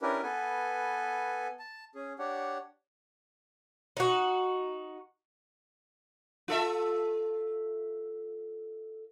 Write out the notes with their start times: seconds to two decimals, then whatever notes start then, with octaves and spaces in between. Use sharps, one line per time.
0.02 C#4 D4 E4 G4 A#4 B4
0.23 B3 A4 B4 G#5
1.59 A5
1.95 C#4 G#4
2.19 D4 G4 C#5 F#5
3.97 D#4 F#4
6.48 F4 A4 E5